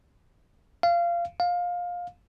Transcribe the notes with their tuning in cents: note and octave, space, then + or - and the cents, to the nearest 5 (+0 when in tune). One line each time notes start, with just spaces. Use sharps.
F5 -20
F5 +20